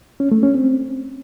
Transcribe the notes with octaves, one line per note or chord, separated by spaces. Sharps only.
C#4
A3
C#4
C4